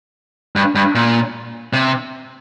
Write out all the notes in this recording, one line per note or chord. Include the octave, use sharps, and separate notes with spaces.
G2
G2
A#2
C3